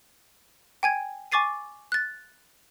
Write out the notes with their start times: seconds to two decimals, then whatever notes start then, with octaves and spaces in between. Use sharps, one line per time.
0.83 G5 G#5 G#6
1.32 G#5 C#6 D6 A6 C7 D#7
1.92 F#6 A6